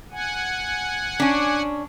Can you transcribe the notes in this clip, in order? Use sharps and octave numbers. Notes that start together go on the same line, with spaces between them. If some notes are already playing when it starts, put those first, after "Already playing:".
F#5 G#5
C#4 D4